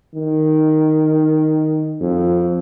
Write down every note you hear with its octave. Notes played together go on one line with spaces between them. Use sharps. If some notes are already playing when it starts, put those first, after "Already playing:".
D#3
F2